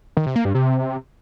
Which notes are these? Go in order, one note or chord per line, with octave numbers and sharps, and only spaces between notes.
D#3
C3
A#3
G2
C3